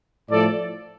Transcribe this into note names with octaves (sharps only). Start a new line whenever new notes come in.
A2 F3 A3 A4 D5